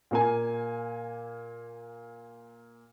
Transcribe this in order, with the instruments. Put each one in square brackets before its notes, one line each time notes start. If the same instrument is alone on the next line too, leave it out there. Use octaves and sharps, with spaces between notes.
[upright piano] A#2 A#3 G#5